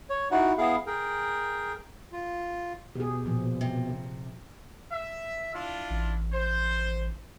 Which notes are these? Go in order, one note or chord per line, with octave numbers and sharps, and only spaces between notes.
C#5
D#4 E4 F#4 F#5
B3 E4 G#4 F5
G#4 A#4 G5
F4
B2 G4 G#4
A#2 F3
C3
E5
D4 E4 F4
A1
C5